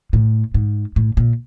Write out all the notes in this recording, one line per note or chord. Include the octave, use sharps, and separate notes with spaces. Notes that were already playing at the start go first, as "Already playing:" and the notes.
A2
G#2
A2
A#2